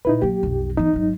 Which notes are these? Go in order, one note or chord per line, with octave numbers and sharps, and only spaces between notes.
A#2 C#3 D#4 E4 B4
F#3 A#3 G4
B1 F2
E3 B3 D#4
G#1 F#3